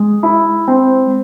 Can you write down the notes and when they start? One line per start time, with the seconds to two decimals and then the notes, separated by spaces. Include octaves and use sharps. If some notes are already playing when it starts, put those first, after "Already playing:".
Already playing: G#3
0.23 E4
0.68 C4